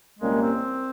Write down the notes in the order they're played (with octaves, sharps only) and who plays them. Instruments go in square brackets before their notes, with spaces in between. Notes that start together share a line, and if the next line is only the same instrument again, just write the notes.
[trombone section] C2 A#2 G3 A#3 C#4 [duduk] G#3
[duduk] C4